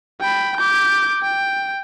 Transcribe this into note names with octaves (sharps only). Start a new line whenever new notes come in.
G5 B5
D6 G6
G5